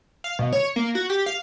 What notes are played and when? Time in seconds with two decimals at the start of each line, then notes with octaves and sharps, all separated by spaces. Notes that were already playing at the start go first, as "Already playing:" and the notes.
0.24 F5
0.39 B2
0.53 C#5
0.76 A#3
0.95 F#4
1.10 G4
1.26 F5